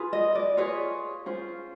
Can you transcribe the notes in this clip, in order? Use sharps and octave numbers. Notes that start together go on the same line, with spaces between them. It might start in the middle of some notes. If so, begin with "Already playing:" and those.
Already playing: F4 G#4 B4
D#5
D5
F4 G#4 B4 C#5
C#4 F4 G#4 C5